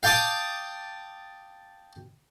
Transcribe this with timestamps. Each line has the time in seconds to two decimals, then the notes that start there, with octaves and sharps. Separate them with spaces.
0.03 F5 G5 A5 D6 D#6